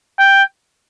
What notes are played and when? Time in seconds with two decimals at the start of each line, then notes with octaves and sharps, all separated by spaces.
0.19 G5